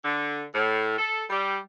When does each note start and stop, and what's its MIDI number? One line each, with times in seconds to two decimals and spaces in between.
0.03 0.41 50
0.53 0.92 45
0.97 1.22 69
1.28 1.56 55